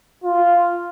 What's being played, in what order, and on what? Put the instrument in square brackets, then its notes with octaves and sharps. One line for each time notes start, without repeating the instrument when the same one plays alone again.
[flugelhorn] F4